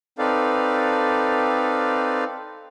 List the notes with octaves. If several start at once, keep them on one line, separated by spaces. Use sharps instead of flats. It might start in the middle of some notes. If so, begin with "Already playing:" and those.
C4 D#4 A4 B4 D5 F5